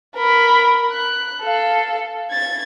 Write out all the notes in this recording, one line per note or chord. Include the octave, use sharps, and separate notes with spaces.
A#4 B5
F#6
A4 F5
G#6 A6